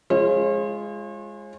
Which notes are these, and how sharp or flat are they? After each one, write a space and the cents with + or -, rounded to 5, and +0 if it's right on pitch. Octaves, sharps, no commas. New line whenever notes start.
G#3 +0 F4 -25 C#5 -45